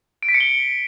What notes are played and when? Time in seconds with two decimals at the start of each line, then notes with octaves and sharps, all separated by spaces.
0.23 D7
0.29 B6
0.34 C#7
0.40 G7